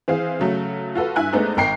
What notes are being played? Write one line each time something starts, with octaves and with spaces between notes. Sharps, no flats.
E3 C4 G#4 F5
C#3 F#3 A3
F4 F#4 A4 B4
G2 E4 G#5 F#6
G#3 A3 B3 C4 D4 D#4
G#1 A#4 G5 C7